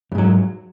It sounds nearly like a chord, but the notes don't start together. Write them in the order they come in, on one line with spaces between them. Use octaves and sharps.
F2 G#2 F#3